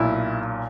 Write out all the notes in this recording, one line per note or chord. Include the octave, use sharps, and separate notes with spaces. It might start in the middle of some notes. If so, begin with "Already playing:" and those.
Already playing: B1 A#2 E4